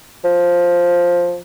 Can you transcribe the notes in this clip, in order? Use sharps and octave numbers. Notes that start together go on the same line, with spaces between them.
F3